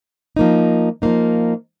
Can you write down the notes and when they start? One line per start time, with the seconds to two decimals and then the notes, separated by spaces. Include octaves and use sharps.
0.36 F3 A#3 D#4
1.02 F3 A#3 D#4